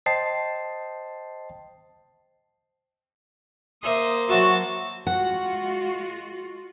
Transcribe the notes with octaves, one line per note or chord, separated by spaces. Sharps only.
C5 D#5 G5 A5 C7
A#3 C5 E5 C6 D#6
F#3 F#4 E5 A5
G#3 F4 F#4 F#5